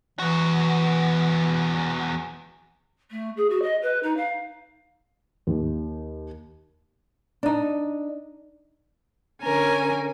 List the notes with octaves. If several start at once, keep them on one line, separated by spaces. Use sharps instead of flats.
E2 E3 F#4
A3
G#4
F#4
D#5
B4
D#4
F5
D#2
D4 D#4
D3 C#4 A#4 G#5